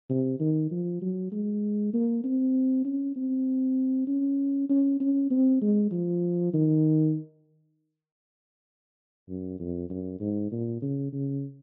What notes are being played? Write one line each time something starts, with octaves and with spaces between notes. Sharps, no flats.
C3
D#3
F3
F#3
G#3
A#3
C4
C#4
C4
C#4
C#4
C#4
C4
G#3
F3
D#3
F#2
F2
F#2
G#2
A#2
C#3
C#3